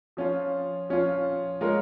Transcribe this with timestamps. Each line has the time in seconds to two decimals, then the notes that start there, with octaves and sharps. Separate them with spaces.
0.17 F3 C#4 F4
0.89 F3 C#4 F4
1.61 G#3 F4 A#4 C#5